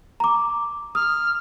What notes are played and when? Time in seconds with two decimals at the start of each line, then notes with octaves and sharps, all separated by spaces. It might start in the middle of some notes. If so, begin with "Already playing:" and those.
0.20 A#5 D6
0.95 D#6 F6